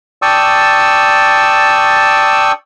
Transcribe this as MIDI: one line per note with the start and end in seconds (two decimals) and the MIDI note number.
0.22 2.52 74
0.22 2.52 79
0.22 2.52 81
0.22 2.52 85
0.22 2.52 87
0.22 2.52 88